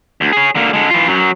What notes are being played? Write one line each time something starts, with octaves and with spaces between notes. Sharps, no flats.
D2
G#4 C#5
D3 A#3
D3 G#3
E3 F4
F#2 F#3